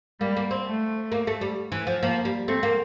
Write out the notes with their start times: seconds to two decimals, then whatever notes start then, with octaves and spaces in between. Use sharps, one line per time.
0.20 G3 A#3
0.37 A#3
0.51 C4
0.67 A3
1.12 A#3
1.27 A3
1.41 G3
1.72 E3
1.87 F3
2.03 F3 A#3
2.25 G3
2.48 A3 C4
2.63 A#3